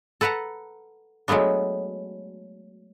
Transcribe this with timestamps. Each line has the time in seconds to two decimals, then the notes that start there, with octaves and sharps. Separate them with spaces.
0.21 A4 B4 F#5 A5 A#5
1.28 F#3 G#3 A3 B3 D4